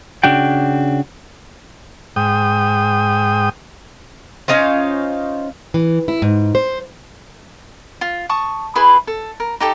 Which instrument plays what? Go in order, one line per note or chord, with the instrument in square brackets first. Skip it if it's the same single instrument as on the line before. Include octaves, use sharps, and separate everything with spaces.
[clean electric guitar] C#3 D4 F#4 G5
[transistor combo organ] G#2 G5 D#6
[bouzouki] C#4 D#4 F4 C5
[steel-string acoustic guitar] E3
E4
G#2
C5
[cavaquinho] F4
A5 C#6 D#6
E4 G#4 B4 C6
A4
A#4
D#4 G4 A4